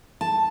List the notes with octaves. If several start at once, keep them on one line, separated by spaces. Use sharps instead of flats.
A5